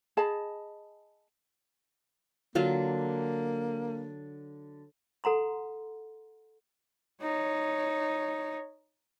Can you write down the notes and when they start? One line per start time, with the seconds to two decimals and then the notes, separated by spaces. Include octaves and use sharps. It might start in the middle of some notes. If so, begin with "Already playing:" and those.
0.17 G#4 D#5 A5 B5
2.55 D3 F#3 A#3 F4
5.24 A4 F#5 A#5 C6
7.22 D#4 C#5